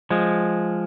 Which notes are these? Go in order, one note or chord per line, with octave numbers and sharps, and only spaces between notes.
F3 G#3